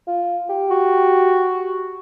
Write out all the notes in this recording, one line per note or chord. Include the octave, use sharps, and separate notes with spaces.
F4
G4
F#4